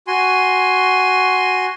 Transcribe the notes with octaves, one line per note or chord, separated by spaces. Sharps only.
F#4 G#5 C6